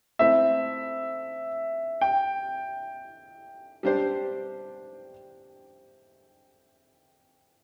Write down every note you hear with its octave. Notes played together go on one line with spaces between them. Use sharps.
A3 C4 E4 E5
G5
G3 D4 G4 C5